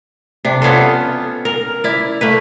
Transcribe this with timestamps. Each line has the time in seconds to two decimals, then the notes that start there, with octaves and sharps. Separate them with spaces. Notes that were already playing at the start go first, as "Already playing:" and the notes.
0.45 C3 D4
0.62 B3 C#4 F4 A4
1.45 A#4
1.84 E4 D5
2.21 A3 A#3 B4